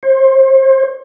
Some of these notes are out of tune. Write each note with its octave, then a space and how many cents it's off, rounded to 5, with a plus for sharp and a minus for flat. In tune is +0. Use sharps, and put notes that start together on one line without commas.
C5 +30